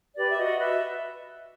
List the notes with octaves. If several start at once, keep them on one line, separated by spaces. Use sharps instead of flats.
G4 B4 D5
E5
F#4 D#5
B4 E5